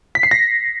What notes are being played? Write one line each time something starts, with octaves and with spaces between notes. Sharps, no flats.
B6
C7
A#6